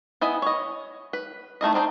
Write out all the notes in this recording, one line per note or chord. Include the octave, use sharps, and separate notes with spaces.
B3 E4 D#5 G#5
C#5 D#5
B4
D#3 A3 E4 D#5
C4 D4 D#4 C5